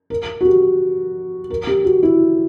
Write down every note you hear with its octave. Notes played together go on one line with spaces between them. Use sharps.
A#4
F#4
G4
A#4
G4
F#4
E4